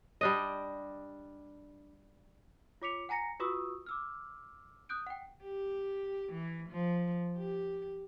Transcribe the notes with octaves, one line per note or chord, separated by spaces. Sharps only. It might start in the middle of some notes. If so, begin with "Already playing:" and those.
G3 D4 D#5
F4 C#5 D6 B6 C#7 F7
F#5 G#5 A#5 A#6 C#7
F4 F#4 B4 C#6 D#6 E6
D6 E6 F6
D#6 F#6 G6 D7
F#5 G5
G4
E3
F3
G4